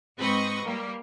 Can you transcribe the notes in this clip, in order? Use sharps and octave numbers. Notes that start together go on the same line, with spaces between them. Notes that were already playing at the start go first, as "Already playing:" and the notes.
G#2 C4 B4 D#5 C#6
G3 A#3